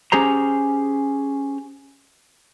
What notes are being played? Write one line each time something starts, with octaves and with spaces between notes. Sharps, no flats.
C#4 G4 G#4 C5 A#5